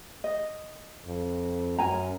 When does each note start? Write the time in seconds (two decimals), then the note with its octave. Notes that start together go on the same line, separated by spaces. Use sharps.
0.24 D#5
1.06 F2
1.79 F#2 A#4 G#5 A#5